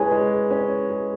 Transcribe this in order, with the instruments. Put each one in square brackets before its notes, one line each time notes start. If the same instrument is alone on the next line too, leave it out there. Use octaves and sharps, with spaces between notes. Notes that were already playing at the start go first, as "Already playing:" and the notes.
Already playing: [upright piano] G#3 C#4 [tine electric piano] E4 B4 C#5 G#5
[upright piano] G#3
C#4
G#3